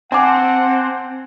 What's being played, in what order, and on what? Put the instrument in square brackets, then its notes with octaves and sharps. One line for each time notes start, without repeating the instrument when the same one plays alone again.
[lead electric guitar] C4 [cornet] F#5 [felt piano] G#5 A5 D6